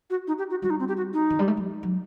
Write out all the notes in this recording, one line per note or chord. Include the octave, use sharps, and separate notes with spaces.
F#4
D#4
G4
F#4
G3 F#4
D#4
C4
G4
F#4
D#4
D#3
G3
A3
F#3
F#3